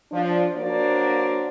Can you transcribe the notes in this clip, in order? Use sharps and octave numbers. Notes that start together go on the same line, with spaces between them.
F3 D4
F#3 A#3 D4 F#4 C5 D5